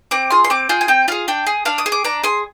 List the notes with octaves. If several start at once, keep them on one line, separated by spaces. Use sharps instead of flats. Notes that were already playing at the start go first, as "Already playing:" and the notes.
C4 D6
F4 G#4 C6
C6
C4 D6
F4 G#4 G5
G#5
C4 G5
F4 G#4 F5
D4 G5
G#4
D4 F5
D#6
G#4
D6
D4 A#5
G#4 C6